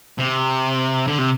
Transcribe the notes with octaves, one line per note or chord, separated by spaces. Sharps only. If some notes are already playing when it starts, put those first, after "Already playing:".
C3
D3
C3